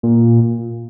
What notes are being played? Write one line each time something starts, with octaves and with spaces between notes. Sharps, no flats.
A#2